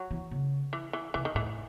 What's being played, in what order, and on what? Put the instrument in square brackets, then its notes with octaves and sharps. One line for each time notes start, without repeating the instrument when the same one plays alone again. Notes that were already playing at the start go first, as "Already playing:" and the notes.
Already playing: [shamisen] F#3
[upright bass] E3
C#3
[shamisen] E3
E3
[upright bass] C3 [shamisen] E3
[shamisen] D#3
[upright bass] A2 [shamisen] E3